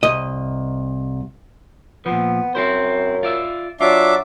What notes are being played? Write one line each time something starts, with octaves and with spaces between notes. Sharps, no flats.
C2 D#5
A#2 F3 B3
F#2 C4 E4 C5
F4 D5 E5
F#3 D4 F4 E5 D6